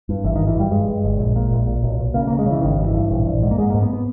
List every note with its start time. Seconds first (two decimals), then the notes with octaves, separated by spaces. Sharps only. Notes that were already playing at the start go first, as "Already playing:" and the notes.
0.09 G2
0.24 G#1 E3
0.36 D#3
0.40 G#1
0.47 E3
0.56 G2 G3
0.71 G2 G#3
0.88 G2
1.04 G1
1.19 A#1
1.36 A#2
1.51 A#1
1.67 A#2
1.83 B1
2.00 B1
2.14 C#3 A#3
2.27 C#3 A#3
2.39 G#3
2.46 C#3 E3
2.62 G#1 D#3
2.79 G2
2.86 E3
2.94 G2
3.11 A#1
3.26 A#1
3.42 G#2
3.51 A#3
3.57 G#2 G#3
3.70 A#3
3.74 G#2
3.82 B3
3.93 B3